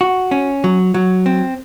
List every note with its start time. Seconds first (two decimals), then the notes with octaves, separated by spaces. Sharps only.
0.01 F#4
0.31 C#4
0.64 F#3
0.94 F#3
1.26 C4